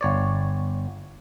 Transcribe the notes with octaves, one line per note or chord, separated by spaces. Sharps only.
G1 C#5 D5